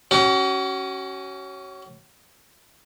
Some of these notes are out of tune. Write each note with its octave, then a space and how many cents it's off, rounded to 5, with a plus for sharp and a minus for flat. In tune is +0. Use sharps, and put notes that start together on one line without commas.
C#4 -5 F#4 +35